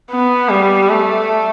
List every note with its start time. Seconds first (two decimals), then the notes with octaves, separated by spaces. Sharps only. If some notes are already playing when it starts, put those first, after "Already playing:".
0.10 B3
0.49 G3
0.89 A3